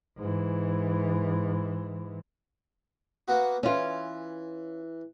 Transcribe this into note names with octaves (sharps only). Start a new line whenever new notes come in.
G#2 E3
A#3 B3 F#4
E3 C#4 F4